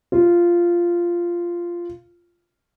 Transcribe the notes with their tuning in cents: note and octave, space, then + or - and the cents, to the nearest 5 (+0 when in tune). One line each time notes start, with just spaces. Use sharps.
F4 -10